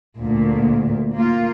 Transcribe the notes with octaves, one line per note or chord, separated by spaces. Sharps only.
D2 A#2
A#3 F4